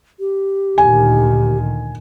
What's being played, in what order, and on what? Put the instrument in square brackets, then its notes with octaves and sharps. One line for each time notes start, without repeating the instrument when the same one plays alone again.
[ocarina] G4
[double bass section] D2 A#2 D#3 [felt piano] G#5